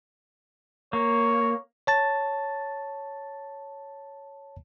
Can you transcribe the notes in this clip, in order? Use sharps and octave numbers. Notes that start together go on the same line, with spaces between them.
A#3 C#5
C#5 A5 A6